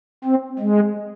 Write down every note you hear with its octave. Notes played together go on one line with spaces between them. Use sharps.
C4
G#3